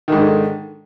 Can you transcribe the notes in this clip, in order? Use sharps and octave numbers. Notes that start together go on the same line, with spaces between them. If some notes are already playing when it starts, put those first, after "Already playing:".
G#2 D3 D#3